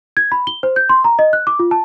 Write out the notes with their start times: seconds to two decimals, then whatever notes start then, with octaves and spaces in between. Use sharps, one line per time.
0.17 G#6
0.32 B5
0.47 G7
0.63 C5
0.76 G6
0.89 C6
1.04 A#5
1.19 D#5
1.33 F#6
1.47 D6
1.59 F4
1.71 A5